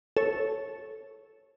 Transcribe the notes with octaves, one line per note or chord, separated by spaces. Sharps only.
A4 C#5